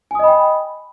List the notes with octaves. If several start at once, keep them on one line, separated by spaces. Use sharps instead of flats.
D#5 G5 G#5 B5 D#6